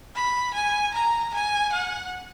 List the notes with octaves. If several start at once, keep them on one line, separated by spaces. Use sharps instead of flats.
B5
G#5
A#5
G#5
F#5